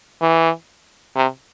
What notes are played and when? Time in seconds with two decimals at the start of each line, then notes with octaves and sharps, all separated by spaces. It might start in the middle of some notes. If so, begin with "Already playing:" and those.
0.22 E3
1.16 C3